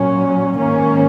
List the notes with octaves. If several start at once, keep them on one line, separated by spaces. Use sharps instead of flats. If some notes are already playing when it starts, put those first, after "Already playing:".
Already playing: A#2 F#3 C#4
G#2 D#3 A#3 C#4